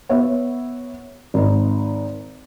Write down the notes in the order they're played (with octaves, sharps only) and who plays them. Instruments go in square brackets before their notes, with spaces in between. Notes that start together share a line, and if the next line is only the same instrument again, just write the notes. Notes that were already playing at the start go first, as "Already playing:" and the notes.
[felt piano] B3 C#5 E5
G#1 D#4